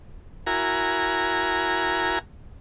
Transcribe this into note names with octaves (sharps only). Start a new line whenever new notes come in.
E4 F#4 A#4 G#5 A#5